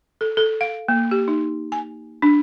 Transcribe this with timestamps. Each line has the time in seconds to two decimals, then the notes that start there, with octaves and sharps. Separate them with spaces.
0.21 A4
0.37 A4
0.61 F5
0.88 A#3
1.11 G4
1.28 D#4
1.72 G#5
2.22 D4